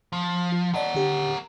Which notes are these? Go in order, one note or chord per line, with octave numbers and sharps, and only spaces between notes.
F3
F4
A#4 D5 D#5 F#5 A5
D3 G4